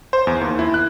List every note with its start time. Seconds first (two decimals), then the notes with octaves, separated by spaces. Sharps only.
0.13 C5
0.27 E2
0.41 D#2
0.59 E4
0.74 F#6